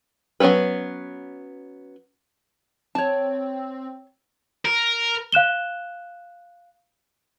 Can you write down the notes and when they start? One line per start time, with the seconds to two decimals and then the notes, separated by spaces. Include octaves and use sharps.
0.40 F#3 B3 C#4 A4 B4
2.95 C4 C#5 A5
4.65 A#4
5.32 F5 F#6 E7 G7